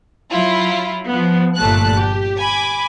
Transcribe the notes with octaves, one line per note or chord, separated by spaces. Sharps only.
F#3 E4 F4
F3 B3
G1 A#2 A3 A5 F#6
G4
G#5 B5 D6